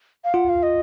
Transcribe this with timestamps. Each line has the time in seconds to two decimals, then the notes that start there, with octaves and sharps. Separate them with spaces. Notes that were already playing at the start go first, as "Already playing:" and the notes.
0.24 F5
0.34 F4 F#5
0.49 F5
0.63 D#5